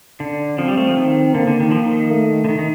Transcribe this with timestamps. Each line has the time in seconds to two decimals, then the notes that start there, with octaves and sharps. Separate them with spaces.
0.20 D3 D4
0.58 F3 C4
0.68 G3
0.77 A3
0.87 F3
0.97 D#3
1.34 D3 A#3
1.47 D3
1.60 D#3
1.71 F3
1.83 D#3
2.10 A3
2.44 D3
2.49 D#3
2.59 D#3